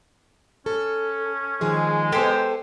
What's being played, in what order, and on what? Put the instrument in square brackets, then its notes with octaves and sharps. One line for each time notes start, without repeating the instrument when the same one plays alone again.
[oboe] C#4 [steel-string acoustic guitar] A4
[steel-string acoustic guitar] D#3 F3 G#4 [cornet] G#3
[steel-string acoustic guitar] B3 A4 [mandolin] G4 C5 [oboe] C6